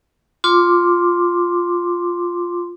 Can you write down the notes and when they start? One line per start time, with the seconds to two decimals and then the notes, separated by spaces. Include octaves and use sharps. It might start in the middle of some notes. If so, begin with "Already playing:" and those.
0.44 F4 C6 D6